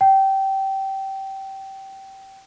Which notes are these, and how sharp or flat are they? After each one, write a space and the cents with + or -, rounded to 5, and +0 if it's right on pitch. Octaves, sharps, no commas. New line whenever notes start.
G5 -20